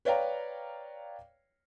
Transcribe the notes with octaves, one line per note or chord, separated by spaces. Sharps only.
B4 C#5 D5 F5 G5 A#5